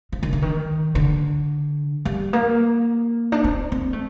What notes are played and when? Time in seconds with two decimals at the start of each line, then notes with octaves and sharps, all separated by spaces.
0.12 F3
0.23 D#3
0.33 D3
0.42 D#3
0.95 D3
2.05 G3
2.33 A#3
3.32 D4
3.44 C4
3.72 C4
3.93 A3